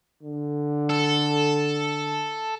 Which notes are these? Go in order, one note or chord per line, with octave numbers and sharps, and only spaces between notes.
D3
A4